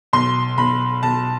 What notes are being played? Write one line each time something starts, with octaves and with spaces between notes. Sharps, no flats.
B1 C6
B1 B5
B1 A5